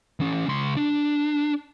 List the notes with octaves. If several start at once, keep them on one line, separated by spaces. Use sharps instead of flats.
E3 C#4
C#2 C6
D4